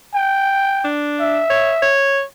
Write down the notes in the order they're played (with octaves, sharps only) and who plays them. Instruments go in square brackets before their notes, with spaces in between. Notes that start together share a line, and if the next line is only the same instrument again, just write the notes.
[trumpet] G5
[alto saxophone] D4
[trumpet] E5
[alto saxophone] C#5
C#5